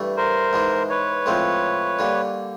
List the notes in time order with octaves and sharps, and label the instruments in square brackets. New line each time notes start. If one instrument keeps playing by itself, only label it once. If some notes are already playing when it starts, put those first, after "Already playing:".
Already playing: [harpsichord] G2 E3 A3
[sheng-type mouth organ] A#4 C5
[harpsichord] G#2 E3 G#3
[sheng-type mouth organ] B4 C#5
[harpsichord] A2 F3 G#3 C4
D3 G3 A#3